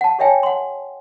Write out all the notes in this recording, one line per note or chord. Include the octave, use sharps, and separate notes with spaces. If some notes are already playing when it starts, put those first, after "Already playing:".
F#5 A5
G4 C#5 D#5 E5 G5 G#5
F#5 C6